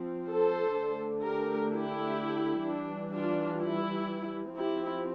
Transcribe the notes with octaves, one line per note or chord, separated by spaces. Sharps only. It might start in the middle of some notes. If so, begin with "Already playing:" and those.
Already playing: F3 C4
A4 C5
D3 A3 D4
G4 A#4
E4 G4
E3 G3 D4
D4 F4
E4
F3 C4 E4 G4